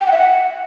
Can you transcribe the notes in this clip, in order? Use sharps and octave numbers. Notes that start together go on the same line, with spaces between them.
G5
F#5
E5
F#5